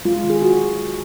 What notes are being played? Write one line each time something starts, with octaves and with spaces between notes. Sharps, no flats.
G#3 F4
D#3
G#4
F#4